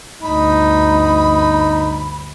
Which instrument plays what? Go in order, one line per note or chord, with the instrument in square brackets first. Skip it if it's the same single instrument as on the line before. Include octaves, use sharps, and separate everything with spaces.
[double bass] G1 D2 [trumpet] D#4 [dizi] B5